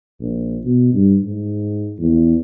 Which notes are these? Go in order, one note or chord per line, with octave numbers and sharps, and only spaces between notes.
A#1
B2
G2
G#2
E2